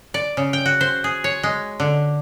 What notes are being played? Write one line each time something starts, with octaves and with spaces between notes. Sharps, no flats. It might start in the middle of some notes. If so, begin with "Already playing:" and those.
D5
C#3
G5
F#4
C5
G#4
C#5
G#3
D3